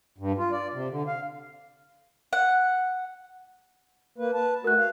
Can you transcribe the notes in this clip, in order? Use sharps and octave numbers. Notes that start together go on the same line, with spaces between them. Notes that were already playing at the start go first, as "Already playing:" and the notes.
G2
F4
D5
C3
D3
F5
F#5
A#3 B4
B4 A5
A3 F#4 A#4 F#6
F5